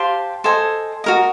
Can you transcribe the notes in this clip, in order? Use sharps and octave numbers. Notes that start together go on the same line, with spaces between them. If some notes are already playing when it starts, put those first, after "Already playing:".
Already playing: G4 C5 F5 A5
A4 C5 D#5 G#5
F#4 A#4 D#5